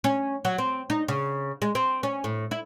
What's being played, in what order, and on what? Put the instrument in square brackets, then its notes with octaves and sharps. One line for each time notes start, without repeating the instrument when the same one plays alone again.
[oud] C#4
F#3
C4
D#4
C#3
G#3
C4
C#4
A2
E4